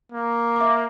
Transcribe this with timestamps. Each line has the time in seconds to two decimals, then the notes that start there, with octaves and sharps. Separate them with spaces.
0.12 A#3
0.56 E5 D6